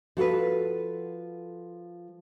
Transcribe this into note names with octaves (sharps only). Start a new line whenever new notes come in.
F3 F#4 A4 B4